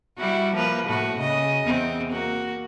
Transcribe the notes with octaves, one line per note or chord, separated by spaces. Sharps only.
G3 E4 F#4
F3 A#3 B4
A2 F#4
C#3 D#5
E2 C4
A#3 F#4